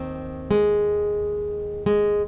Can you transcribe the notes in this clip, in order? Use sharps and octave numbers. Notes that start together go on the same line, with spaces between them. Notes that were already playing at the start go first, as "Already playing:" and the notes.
Already playing: D#2 D#3 C4
G#3
G#3